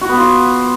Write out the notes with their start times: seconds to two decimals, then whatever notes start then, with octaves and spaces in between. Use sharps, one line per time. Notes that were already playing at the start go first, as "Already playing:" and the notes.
0.01 F#4
0.09 B3
0.17 F4